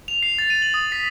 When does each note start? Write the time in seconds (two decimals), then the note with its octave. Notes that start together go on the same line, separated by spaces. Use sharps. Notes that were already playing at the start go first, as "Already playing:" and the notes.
0.08 F7
0.23 C7
0.38 A6
0.50 D#7
0.62 F#7
0.74 D#6
0.92 B6